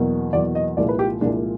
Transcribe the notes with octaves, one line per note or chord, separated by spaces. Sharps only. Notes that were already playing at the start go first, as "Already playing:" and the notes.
Already playing: E2 B2 F#3 A#3
E2 B2 F#3 A#3 D5
D#5
C2 A#2 F3 G#3 D5
B4
G4
C2 A#2 F3 G#3 D4